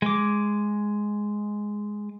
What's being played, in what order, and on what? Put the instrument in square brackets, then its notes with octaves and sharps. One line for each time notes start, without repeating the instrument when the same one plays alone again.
[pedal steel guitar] G#3 D6